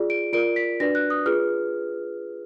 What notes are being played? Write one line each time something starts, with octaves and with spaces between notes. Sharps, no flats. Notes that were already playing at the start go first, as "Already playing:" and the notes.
Already playing: F4 G#4 D5
D7
F4 A#4 D5 D7
B6
D4 F#4 B4 D5 A#6
F#6
D#6
F4 G#4 B4 F6